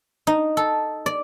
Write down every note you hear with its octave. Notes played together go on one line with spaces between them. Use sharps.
D#4
A4
D5